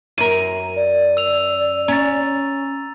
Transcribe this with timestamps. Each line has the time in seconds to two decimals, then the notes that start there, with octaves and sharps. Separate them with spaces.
0.18 F#2 A#4 D#7
0.76 D5
1.17 E6 F7
1.88 C#4 A#5 A6